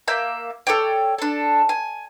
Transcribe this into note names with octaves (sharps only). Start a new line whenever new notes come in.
A#3 E5 G6
A4 C#5 D5 G5
D4 A4
G#5